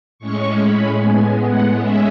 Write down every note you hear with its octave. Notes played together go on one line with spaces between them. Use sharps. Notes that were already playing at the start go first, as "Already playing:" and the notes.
A2 G#3 C#4 C#6
B5
A2 G#3 B3 G#5
F#5
G#3 C#4 E5